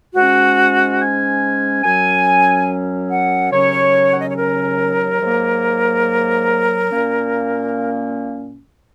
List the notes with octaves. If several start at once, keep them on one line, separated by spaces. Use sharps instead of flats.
G#2 G#3 C#4 F#4
G#5
F#2 F#3 C#4 G#5
F#5
D#2 C#3 F#3 C#4 C#5
F#5
D#5
C#5
A#4
G#2 F#3 A#3
A#2 A#3 C#4